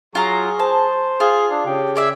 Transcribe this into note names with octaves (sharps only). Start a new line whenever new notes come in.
F#3 F4 G#4 A#5
C5 A5
F4 G#4
D4
C#3 G4
G#4 D5 E5